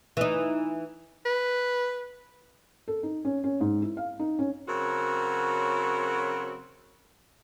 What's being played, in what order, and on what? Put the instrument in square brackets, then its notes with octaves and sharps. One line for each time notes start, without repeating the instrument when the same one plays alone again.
[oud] E3 D#4
[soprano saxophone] B4
[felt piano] A4
D#4
C#4
C#4
G#2
E4
F5
D#4
C#4
[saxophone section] C#3 F#3 C4 F#4 A#4